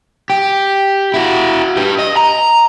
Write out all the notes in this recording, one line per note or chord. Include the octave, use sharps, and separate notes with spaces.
G4
E4 F#4
G4 B4
D#5
A#5